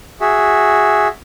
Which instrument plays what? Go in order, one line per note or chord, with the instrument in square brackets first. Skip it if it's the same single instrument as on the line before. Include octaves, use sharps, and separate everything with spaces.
[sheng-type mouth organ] F#4 G#4 E5